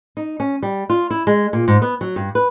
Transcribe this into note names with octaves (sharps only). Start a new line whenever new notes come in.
D#4
C#4
G3
F4
E4
G#3
A#2
G#2
B3
F#3
G2
B4